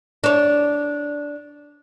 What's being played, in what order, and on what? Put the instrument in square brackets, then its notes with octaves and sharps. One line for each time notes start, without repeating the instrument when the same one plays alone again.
[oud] D4 C#5